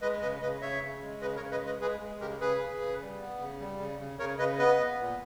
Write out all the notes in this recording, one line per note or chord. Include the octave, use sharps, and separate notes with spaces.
G#3 B4 D#5
C#3 B4 D#5
C#3 B4 D#5
C#3 C#5 E5
C#3
G#3
C#3 B4 D#5
A#4 C#5
C#3
B4 D#5
G#3 B4 D#5
G#3 G#4 B4
G#3
C#3 G4 A#4
C#3 G#4 B4
C#3
C#3
G3
B3
C#3
G3
C#3
C#3
C#3 A#4 C#5
C#3 B4 D#5
B3 B4 D#5
B3
A#2